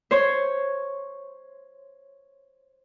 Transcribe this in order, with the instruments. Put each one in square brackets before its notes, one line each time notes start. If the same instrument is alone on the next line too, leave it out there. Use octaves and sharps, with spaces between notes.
[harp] C5 C#5